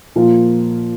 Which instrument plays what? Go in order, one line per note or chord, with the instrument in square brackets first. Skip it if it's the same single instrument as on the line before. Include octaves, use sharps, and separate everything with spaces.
[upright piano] A#2 F3 A#3 F4